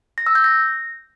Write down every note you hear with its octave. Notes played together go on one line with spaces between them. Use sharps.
A#6
E6
G6
A#6